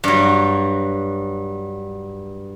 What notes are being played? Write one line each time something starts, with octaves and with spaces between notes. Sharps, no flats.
G2 F#3